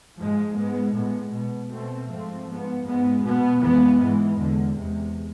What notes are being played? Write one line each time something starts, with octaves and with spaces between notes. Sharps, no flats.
G#2 F3 G#3
G#2 G#3 B3
A2 G#3 B3
B2 B3
B2 A3 C4
G#2 F3 A3 C4
G#2 F3 B3
G#2 G#3 B3
B2 B3
F2 E3 G#3 B3
G#2 E3 G#3
E2 D3 G#3
E2 C3 G#3